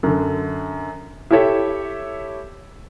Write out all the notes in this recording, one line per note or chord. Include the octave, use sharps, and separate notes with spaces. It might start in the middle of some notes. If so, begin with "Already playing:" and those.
F#2 D3
E4 G4 A4 C#5 E5